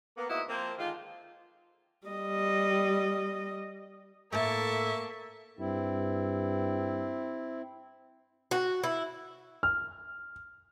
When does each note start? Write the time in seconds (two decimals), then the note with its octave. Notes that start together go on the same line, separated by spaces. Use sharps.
0.17 A#3 B3
0.29 G#2 A#3 B3 E4 F#4 D#5
0.48 F3 A#3 C4
0.78 D3 D#3 G#3 F4
2.08 G3 D#5
4.33 A2 A#3 E4 E5 A5 C#6
5.59 G2 C4 E4
8.51 F#4
8.84 E4
9.63 F6